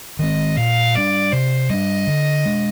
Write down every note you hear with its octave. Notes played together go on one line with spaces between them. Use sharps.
D#3 G#3 C4 D#5
A#2 F5
G3 A#3 D4 D5
C3 C5
G3 D4 D#5
D3
G#3 D4